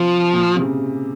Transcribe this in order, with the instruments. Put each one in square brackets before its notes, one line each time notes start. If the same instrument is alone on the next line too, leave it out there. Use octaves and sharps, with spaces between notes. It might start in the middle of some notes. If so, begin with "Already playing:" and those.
Already playing: [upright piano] C3 [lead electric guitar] F3
[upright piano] A#2
C3
C#3